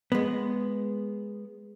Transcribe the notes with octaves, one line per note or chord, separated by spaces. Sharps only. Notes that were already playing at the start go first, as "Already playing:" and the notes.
G#3 B3